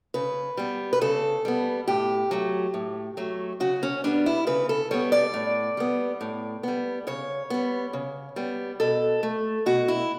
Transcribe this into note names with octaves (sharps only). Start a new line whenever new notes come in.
C#3 B4
G3 B3
B4
C#3 A4
G3 B3
A2 G4
F#3 A3
A2
F#3 A3
C#3 F#4
C#4
G3 B3 D4
E4
C#3 B4
A4
G3 B3 C#5
D5
A2
G3 B3
A2
G3 B3
C#3 C#5
G3 B3
C#3
G3 B3
B2 A4
A3
B2 F#4
E4